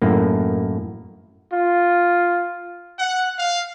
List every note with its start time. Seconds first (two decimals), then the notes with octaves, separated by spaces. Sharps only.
0.02 F#2 A2 A#3
1.53 F4
2.99 F#5
3.39 F5